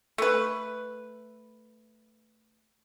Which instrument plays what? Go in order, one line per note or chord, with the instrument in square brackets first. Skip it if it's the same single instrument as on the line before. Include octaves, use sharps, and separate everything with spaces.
[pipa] A3 B4